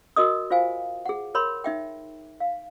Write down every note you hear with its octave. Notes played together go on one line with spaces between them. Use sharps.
F#4 A#4 D#5 D#6
F4 C5 F5 G#5
G#4 F#5
A#4 C#5 B5 C6
D#4 E5 G5
F5